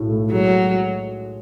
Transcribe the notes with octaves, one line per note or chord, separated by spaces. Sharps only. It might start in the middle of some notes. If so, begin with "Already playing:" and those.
Already playing: B1 A2 F#3
A3
F#3 G#3